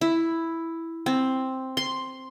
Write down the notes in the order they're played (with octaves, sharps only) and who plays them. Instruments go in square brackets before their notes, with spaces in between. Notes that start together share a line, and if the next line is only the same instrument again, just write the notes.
[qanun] E4
C4
C6